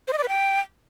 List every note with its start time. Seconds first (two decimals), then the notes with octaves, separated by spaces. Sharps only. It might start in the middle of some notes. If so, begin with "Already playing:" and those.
0.08 C5
0.13 D#5
0.18 D5
0.23 B4
0.28 G5